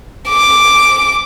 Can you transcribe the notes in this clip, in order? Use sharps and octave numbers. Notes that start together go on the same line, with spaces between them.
D6